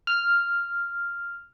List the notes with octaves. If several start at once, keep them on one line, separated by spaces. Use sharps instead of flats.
F6